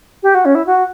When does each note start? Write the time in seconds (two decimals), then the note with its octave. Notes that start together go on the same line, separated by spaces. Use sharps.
0.23 G4
0.35 F#4
0.45 C#4
0.55 E4
0.66 F#4